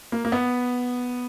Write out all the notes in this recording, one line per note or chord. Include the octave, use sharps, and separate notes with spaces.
A#3
A#3
B3